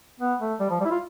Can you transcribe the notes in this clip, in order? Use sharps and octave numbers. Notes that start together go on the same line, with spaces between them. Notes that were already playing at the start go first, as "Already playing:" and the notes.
B3
A3
G3
F3
G3
E4
F4